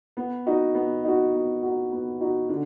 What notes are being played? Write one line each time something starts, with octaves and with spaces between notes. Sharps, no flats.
B3
D#4 F#4
B3
D#4 F#4
B3
D#4 F#4
B3
D#4 F#4
D3